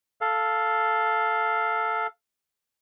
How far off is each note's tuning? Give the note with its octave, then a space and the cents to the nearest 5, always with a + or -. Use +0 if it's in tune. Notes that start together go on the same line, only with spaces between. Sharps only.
A4 +0 F5 +0